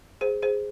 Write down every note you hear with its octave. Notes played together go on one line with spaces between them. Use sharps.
G#4 C5
G#4 C5